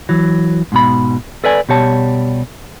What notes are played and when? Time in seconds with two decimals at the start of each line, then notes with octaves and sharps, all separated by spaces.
0.09 E3 F#3
0.72 G#2 B2 B5
1.44 A4 B4 D5 G#5
1.69 B2 G3 G4 C#5 A5